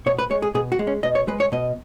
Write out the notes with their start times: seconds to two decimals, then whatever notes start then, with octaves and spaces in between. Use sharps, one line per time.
0.06 B2 C#5
0.19 B4
0.30 G#3 C#5
0.42 G#4
0.54 B2 G#4
0.72 F#4
0.79 G#3
0.87 C#4
1.03 B2 D#5
1.15 C#5
1.28 G#3 B4
1.40 C#5
1.52 B2 D#5